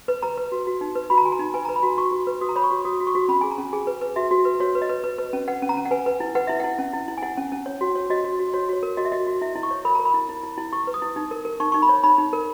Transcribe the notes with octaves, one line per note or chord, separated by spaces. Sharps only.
B4
B4 A#5
B4
F#4
F#4
D#4
B4
F#4 B5
A#5
F#4 G#5
A#5
D#4
B4 G#5
A#5
B4
B5
F#4 A#5
F#4 C#6
F#4
B4
F#4 D#6
A#5
C#5 B5
C#6
F#4
F#4 D#6
F#4
C#6
F#4
C#4 B5
G#4 G#5
A#5
C#4
G#4 G#5
B4
B4
F#4 E5
F#4
B4
F#4 C#5
B4
D#5
B4
B4
B4
C#4
B4 F#5
C#4
A#5
C#4
F#5
B4 G#5
B4
E4
B4 F#5
E4 E5
E4 F#5
C#4
E4
E4
G#5
E4 F#5
C#4
C#4
C#5
F#4
C#5
F#4 D#5
F#4
F#4
F#4 C#5
F#4 C#5
A#4
F#4 D#5
E5
F#4 D#5
F#4
E4 E5
E4
C#6
C#5
A#4 B5
A#4 A#5
B5
E4
E4
E4
E4
E4 C#6
B4
D#6
E4
D#4
A#4
A#4
D#4 C#6
D#4 C#6
B5
C#5
D#4 B5
D#4
A#4